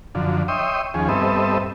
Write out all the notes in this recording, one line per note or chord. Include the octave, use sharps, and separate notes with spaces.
F#2 D3 F3
C#5 D#5 E5 G5 C6 D#6
D#2 F3 C#4 G#4
G2 B3 C4 A4 D#5 E5